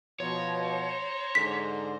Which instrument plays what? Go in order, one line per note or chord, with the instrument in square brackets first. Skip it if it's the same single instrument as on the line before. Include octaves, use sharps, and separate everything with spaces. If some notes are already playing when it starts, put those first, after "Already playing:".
[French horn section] B2 F3 [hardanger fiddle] C5 A#5 [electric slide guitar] C#5
[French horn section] G#2 D3 [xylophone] B6